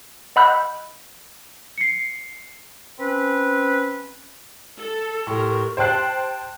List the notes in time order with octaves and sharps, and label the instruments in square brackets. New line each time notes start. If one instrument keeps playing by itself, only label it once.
[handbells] D#5 F#5 B5 E6 F#6 G6
[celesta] C7 C#7
[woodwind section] C4 C#4 B4
[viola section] A4
[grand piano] A2 [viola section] G4 A#4 [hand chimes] A#5 C6 C#6
[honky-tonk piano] C5 G5 A5 F#6 C7